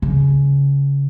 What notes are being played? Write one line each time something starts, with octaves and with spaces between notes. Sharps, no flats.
C#3